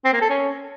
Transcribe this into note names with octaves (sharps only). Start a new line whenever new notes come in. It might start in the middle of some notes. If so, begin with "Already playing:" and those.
C4
A#3
A4
C#4